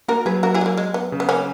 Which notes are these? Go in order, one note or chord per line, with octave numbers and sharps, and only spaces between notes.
A#3 F#4 A#4
F#3 G#4 B4
F#4 A#4
E4 G#4
G#3
A#3
G#3
B3
C#3
B3
A#3 C#4